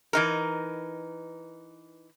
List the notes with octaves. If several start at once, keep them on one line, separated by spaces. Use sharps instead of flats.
E3 D#4 A#4